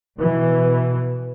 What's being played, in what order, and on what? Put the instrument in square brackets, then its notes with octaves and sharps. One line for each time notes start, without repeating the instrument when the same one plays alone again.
[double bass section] B2 E3